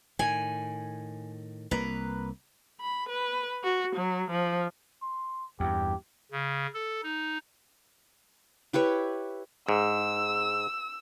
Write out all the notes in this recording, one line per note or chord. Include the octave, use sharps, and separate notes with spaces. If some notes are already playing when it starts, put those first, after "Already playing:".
A2 D#3 G#5
C2 A#3 B4 A#5
B5
B4
F#4
F#3
F3
C6
E2 G2 G4
C#3
A4
D#4
E4 G4 B4 C#5
G#2 E6